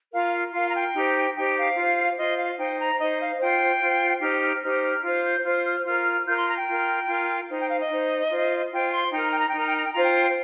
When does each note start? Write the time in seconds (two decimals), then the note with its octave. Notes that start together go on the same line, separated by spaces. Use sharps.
0.12 F4 A#4 F5
0.53 F4 A#4 F5
0.67 A#5
0.74 G5
0.94 D#4 G4 C5
1.35 D#4 G4 C5 G5
1.56 F5
1.76 F4 C5
2.17 F4 C5 D#5
2.37 F5
2.58 D#4 C5 G5
2.78 A#5
2.99 D#4 C5 D#5
3.19 F5
3.39 F4 C5 G5
3.80 F4 C5
4.21 D#4 G4 C5 F6
4.42 F6
4.63 D#4 G4 C5 F6
4.82 F6
5.03 F4 C5 F6
5.24 G6
5.44 F4 C5 F6
5.64 F6
5.84 F4 A#4 F6
6.26 F4 A#4 G6
6.36 C6
6.46 A#5
6.56 G5
6.67 F4 A#4
7.07 F4 A#4
7.48 D#4 C5
7.59 G5
7.69 F5
7.79 D#5
7.89 D#4 C5
8.30 F4 C5
8.72 F4 C5 G5
8.91 C6
9.12 D#4 A#4 G5
9.21 A#5
9.30 G5
9.39 A#5
9.47 G5
9.52 D#4 A#4 A#5
9.66 G5
9.74 A#5
9.83 G5
9.92 F4 C5 A#5
10.02 G5